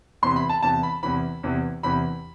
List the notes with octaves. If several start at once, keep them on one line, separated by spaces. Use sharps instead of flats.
E2 C3 E3 C6
B5
A5
E2 C3 E3 A5
B5
E2 C3 E3 B5
E2 C3 E3
E2 C3 E3 B5